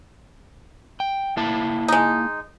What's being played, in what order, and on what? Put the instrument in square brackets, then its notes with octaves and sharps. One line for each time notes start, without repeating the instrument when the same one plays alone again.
[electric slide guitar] G5
A#3 E4 A5
[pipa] G#3 D#4